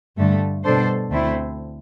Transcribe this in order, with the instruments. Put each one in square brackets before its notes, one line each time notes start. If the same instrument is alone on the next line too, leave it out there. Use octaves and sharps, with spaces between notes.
[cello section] G2 D3 A3
B2 G3 D4 A4 C5
D2 D3 A3 C4 E4